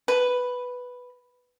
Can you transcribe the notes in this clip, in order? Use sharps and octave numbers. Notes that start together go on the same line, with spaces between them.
B4